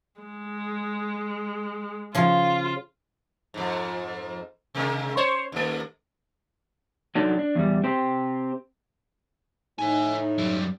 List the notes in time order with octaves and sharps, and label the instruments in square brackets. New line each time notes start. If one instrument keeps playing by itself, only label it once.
[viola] G#3
[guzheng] C#3 F3 [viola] F4 [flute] F5
[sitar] F2 G#2
C3 G#3 A#3
C5 C#5
D#2 A3
[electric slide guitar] F#3 D4 D#4 A4
D4
E2 G3
C4 G4 C5
[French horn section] A2 D#4 [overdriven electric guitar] E4 G#5
[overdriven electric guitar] F#2 G3